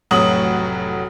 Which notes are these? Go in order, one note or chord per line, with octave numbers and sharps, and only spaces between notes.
F1 A2 F#3 F#4 D#6 F#7